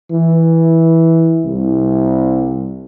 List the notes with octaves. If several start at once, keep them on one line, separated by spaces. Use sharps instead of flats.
E3
C2